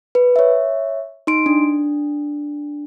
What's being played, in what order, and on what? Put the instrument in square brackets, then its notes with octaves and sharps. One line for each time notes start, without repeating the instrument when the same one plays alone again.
[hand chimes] B4
C#5 E5
D#4 C6 D7
D4